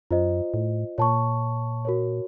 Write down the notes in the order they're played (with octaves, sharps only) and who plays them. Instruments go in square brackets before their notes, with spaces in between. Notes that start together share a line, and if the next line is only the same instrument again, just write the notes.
[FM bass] F#2 [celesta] F4 C5 D#5
[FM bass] A2
[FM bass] A#2 [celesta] C#5 A5 C#6
[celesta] F#4 A#4 C#5